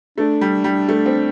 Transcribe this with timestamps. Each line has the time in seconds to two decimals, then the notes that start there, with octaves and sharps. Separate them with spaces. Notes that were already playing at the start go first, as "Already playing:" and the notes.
0.18 A3 D4
0.41 G3
0.64 G3
0.89 A3
1.06 C4